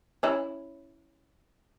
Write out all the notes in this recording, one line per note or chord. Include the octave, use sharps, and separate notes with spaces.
C#4 E4